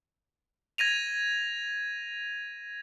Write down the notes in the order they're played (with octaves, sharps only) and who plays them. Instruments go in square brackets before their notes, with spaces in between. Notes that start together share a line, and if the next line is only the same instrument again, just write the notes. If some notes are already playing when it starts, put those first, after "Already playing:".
[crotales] G#6 A#6 D#7 F7